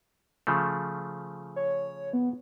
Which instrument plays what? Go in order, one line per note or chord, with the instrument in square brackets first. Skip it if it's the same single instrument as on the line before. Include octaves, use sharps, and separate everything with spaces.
[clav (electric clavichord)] C#3 F3 A3
[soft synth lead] C#5
B3